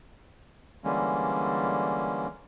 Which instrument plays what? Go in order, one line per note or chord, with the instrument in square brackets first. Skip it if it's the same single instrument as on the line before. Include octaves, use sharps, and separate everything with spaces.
[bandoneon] D3 E3 G3 G#3 A#3 C#4